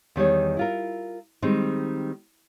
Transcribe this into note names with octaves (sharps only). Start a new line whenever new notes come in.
E2 D#3 G3 C#5
E4 F4 A#4
D#3 G3 G#3 C4 D#4